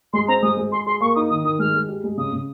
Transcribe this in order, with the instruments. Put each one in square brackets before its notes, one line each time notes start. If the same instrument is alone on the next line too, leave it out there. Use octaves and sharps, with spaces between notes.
[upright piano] G#3 [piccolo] C6
[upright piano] C4 [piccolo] A#5
[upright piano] G#3 [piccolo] D#6
[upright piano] G#3
[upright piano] G#4 [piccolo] C6
[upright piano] G#4 [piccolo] C6
[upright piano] A#3 [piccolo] C#6
[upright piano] D#4 [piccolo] D#6
[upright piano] D#3 [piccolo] D#6
[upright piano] D#3 [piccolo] D#6
[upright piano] G#3 [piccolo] F6
[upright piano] G#3
G4
G#3
[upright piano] C#3 [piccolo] D#6
[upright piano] C#3